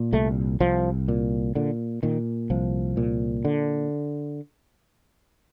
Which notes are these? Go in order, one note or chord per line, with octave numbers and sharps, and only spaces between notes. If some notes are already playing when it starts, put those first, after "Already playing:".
Already playing: A#2
C2 A3
C2 F3
A#2
A#2 D3
A#2 D#3
C2 F3
A#2
D3